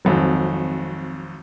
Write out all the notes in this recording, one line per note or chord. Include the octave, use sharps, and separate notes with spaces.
G#1 F2 F#3